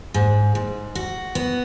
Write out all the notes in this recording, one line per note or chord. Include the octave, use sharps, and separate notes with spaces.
G#2
G#2
F#4
B3